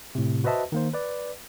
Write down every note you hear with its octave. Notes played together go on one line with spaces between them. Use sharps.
A2 C3
F#4 B4 C5 D#5 E5 A5
D#3 A#3 C5
B4 D5